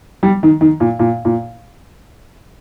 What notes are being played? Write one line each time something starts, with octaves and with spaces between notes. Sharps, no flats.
G3
D#3
D#3
A#2
A#2
A#2